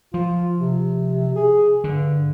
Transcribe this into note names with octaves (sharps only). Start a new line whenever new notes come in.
F3 F4
C3
G#4
G2 D3